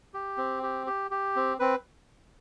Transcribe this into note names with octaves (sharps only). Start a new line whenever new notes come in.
G4
C4
G4
G4
G4
C4
C4 B4